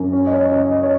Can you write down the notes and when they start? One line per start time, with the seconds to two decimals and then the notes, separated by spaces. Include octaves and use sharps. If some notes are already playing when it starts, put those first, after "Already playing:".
Already playing: F#2
0.12 C#4
0.26 D#5
0.32 C#5
0.51 C#3 D#5
0.71 D#5
0.83 C#5